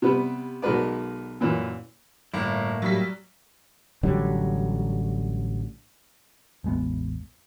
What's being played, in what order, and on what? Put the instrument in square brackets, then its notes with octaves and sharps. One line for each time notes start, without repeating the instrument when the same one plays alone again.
[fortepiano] C3 G3 B3 B4
B1 G#3 F#4 A#4 B4 D5
F#2 A#2 E3 C#4
[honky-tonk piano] G1 [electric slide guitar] A2 A#3 E4
[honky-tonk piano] F#3 G3 B6
[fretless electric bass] A1 D3 F#3 G3
[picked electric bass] A1 E2 G#3 B3